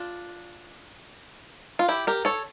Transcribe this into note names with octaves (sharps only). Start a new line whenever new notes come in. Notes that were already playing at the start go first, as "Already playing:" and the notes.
Already playing: D4 F4
F4
E4 G4
G4 A#4
A4 C#5